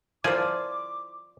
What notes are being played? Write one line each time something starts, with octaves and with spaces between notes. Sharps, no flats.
F3 E4 F4 A#4 C5 D5 G#5 D6